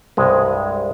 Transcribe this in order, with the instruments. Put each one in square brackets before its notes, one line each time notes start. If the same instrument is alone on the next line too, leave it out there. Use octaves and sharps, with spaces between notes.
[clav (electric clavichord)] C2 G2 G#3